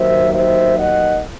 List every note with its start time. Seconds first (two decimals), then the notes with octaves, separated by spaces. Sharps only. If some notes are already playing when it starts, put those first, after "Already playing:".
Already playing: D#2 D#3 F#3 C5 E5
0.34 C5 E5
0.79 D#5 F#5